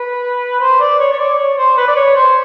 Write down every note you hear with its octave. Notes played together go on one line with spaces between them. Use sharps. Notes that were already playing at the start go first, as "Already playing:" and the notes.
Already playing: B4
C5
D5
C#5
C#5
D5
C#5
C5
B4
D5
C#5
C5